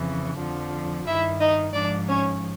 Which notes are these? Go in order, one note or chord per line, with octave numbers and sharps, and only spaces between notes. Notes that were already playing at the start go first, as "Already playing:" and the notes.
Already playing: F2 C#3 E3
F2 D3 F3
G2 D#3 E4 E5
D#4 D#5
G#2 F3 D4 D5
C#4 C#5